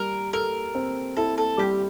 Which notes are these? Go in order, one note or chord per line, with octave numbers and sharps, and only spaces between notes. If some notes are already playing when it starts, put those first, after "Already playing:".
Already playing: G3 A#4
A4 A#4
C4
E4 A4
A4
G3 G4